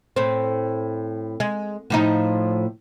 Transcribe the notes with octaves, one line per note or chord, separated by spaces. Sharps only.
A2 C4
G#3
A2 F3 D#4